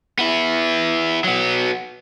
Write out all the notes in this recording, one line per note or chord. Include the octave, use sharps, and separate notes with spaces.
B3 E4
F#3 B3